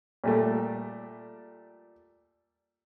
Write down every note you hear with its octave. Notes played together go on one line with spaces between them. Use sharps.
A#2 G3 A3